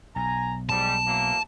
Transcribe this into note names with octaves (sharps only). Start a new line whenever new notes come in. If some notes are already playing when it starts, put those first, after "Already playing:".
B1 G#5 A#5
G#2 G3 A5
E3 F#3 A#3